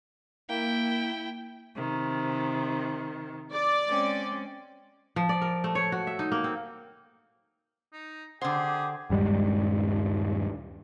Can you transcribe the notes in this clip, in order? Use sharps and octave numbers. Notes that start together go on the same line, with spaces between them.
A#3 E4 G5
C3 D#3
D5
G#3 C4 C#4
F3
D5
A#4
A3
C#5
F#4
E5
D#4
A#3
C4
D#4
D3 G4 G#4 C5 F#5
D#1 G2 G3 G#3